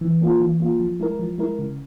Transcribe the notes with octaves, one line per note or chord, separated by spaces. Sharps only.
E3
A#3 F4
E3
A#3 F4
F3
G#3 E4 A#4
F3
G#3 E4 A#4
C#3